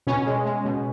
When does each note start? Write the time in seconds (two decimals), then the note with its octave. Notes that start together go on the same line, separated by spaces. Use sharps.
0.07 B2 C#4
0.26 G#3
0.46 G#3
0.65 B2